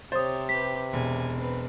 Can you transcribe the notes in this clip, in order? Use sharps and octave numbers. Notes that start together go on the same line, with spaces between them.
C3 G4 C5 C#5 D#6 A6
G4 B4 B6
E1 G#5
C4 B4